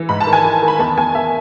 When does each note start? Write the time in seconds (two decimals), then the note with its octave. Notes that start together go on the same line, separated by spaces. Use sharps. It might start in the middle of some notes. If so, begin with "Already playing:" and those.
Already playing: E3
0.09 G#2 B5
0.20 A5
0.27 D#3
0.33 G#5
0.44 D#3
0.62 D#3
0.68 B5
0.79 E2 A5
0.97 E2 G#5
1.15 E2 E5